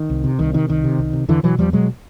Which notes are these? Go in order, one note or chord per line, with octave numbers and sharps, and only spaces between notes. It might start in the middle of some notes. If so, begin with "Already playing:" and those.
Already playing: D#3
C2
C3
C2 D#3
C3 D#3
C2 D#3
C3
C2
C3
E2 D3 E3
B2 E3 F#3
E2 F3 G3
B2 F#3 G#3